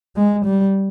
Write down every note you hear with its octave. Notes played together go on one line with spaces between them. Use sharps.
G#3
G3